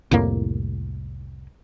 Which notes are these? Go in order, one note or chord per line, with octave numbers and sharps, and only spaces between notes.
C2 F2 A2 A#3